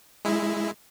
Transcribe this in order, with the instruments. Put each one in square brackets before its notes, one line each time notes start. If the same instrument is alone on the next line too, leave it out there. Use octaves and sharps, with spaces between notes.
[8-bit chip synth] G#3 E4